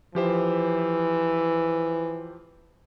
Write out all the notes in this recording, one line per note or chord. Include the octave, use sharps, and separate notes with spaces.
E3 F3 G4 C5